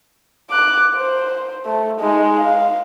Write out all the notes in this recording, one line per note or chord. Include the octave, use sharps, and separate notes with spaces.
D6 F#6
C5
A3
G#3 D#4
F5